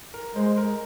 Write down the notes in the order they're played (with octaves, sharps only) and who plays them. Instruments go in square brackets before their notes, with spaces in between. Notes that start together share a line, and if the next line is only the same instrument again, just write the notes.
[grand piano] A#4
[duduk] G#3 [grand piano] C5
[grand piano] A#4